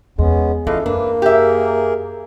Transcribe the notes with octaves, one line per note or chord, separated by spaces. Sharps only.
E2 G#3 B3 C#4
E3 C#4 F4 A4 D#5 F5
F#2 A#3 D4 B4
G4 G#4 A#4 E5